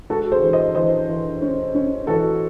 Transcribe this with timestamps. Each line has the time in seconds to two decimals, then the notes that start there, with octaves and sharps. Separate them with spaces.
0.09 G#3 F#4 A4
0.32 G#4 C5
0.42 E3
0.53 C5 D#5
0.75 E3 C5 D#5
1.09 E3
1.42 C#4
1.75 C#4
2.07 E3 F#4 A4